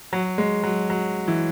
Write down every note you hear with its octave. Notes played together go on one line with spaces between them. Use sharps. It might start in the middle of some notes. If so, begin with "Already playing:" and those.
F#3
G#3
F#3
F#3
E3